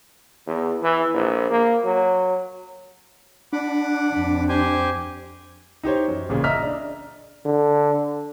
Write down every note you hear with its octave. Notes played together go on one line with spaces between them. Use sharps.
E2
E3
A#1
A#3
F#3
D4 F#5 B5 D6
F2
G4 C5 G#5
D#4 G4 C5 C#5
F#2
A1 A#2 C#3
D#5 E5 A#5 F6 B6
D4
D3